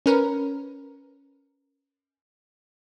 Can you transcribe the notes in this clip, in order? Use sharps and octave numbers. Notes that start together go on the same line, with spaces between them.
C#4 A#4 B4